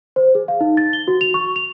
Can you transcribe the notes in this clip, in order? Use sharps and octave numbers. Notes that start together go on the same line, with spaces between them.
C5
G#4
F5
D#4
A6
G7
F#4
F7
C#6
F7